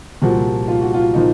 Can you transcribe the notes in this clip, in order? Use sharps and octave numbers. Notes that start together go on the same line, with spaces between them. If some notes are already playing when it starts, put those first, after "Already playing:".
C2 A#2 F3 F#4
F4
F#4
F4
A#2 F3 D#4